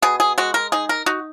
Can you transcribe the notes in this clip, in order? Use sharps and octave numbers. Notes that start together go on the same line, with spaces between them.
B2 G#4
G#4
G#3 F#4
A#4
D#4 G#4
A#4
D#4 F#4